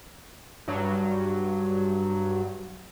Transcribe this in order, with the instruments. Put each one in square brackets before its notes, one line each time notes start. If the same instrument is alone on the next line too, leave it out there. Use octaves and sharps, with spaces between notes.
[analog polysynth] G2 F#3